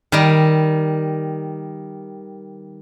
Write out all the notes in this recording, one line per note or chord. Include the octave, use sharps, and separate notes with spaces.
D#3 G3